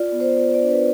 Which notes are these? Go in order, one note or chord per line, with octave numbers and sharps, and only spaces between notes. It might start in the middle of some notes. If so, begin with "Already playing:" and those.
Already playing: F4 D5
B3
C5
F4 D5
D5
D4
B4